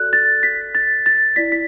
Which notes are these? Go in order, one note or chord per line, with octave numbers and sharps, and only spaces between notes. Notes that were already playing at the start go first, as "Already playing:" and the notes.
Already playing: F#4 A4 D5 F#6
A6
B6
A6
A6
E4 D5 B6
B6